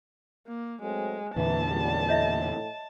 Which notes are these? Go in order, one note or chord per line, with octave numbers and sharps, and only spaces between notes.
A#3
F#3 G#3 A3 C4
E2 A#2 D3 E3 A5
C#2 G3
A2 C#5 D#5 E5